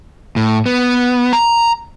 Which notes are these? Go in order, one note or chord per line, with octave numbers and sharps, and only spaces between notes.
A2
B3
A#5